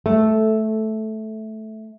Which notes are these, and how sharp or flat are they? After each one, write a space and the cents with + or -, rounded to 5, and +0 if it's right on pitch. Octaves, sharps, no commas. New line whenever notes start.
A3 -10